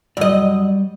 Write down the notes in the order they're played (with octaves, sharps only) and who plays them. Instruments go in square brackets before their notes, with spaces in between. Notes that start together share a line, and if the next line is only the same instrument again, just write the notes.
[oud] F#2 D#5 [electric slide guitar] G3 D5